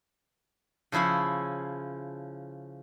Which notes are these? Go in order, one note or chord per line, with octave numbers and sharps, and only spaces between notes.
C#3 F3 E4 G#4 C#5